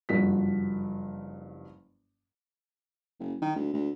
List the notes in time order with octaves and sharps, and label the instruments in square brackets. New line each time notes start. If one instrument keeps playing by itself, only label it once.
[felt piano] F#1 G2 F3 F#4 B6
[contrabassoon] F#1
D#3
D2
D2